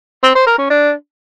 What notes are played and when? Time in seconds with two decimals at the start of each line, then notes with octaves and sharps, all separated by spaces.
0.23 C4
0.35 C5
0.47 A#4
0.58 C#4
0.70 D4